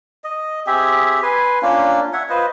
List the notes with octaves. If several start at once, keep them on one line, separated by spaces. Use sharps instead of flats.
D#5
C4 G4 G#4 E5
B4 G#5 C6
A#3 C#4 D4 F4
C#5 E5 F#5
F4 B4 C5 D#5